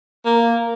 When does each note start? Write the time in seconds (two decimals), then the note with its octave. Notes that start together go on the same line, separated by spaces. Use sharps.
0.24 A#3